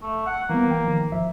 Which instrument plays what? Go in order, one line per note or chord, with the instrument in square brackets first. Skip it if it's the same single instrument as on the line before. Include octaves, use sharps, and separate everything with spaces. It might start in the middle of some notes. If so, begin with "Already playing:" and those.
[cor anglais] A3
F#5
[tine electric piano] E3 G3 B3 [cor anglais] A#3
[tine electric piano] G5
D#3 F3
G#1 F3 E5